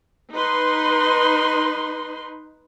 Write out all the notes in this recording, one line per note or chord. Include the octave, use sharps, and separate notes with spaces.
D#4 B4 C6